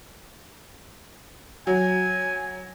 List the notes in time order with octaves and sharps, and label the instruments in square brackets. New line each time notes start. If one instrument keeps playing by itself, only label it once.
[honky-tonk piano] F#3 [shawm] G#5